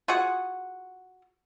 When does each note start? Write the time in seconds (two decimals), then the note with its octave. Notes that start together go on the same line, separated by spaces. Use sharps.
0.08 F4 F#4 G#4 F#5